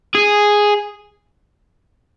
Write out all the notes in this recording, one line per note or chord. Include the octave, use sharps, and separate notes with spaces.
G#4